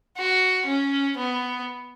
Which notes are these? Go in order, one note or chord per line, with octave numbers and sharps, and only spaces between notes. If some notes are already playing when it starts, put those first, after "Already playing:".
F#4
C#4
B3